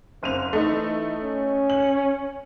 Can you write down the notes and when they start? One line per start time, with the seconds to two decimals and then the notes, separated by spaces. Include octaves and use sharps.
0.23 F#1 C4 D#7 F7
0.53 E3 A3 D#4
1.21 C#4
1.70 F#7